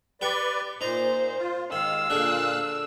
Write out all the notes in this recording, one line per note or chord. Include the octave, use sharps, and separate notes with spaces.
G4 B4 D5 G5 C#6
A#2 D#4 C5 A#5
F4
D#3 G#3 F5 E6
A#2 D3 D4 G#4 F5 F#6